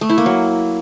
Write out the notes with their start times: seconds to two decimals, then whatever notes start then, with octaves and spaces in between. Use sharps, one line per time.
0.01 A3
0.10 E4
0.18 A#3
0.26 F#3